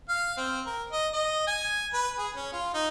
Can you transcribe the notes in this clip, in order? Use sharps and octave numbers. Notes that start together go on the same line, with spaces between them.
F5
C4
A#4
D#5
D#5
G#5
B4
G#4
C#4
F4
D#4